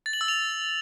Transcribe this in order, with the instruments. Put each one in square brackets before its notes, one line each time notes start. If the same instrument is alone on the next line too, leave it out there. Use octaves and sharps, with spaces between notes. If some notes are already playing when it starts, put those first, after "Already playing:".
[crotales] A6
F#7
E6
F7